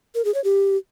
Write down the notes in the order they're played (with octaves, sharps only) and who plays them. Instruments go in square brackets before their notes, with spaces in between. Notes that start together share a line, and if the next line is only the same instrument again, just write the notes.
[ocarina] A#4
G#4
C#5
G4